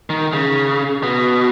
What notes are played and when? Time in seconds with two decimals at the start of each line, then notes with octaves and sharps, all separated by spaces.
0.10 D#3
0.33 C#3
1.03 B2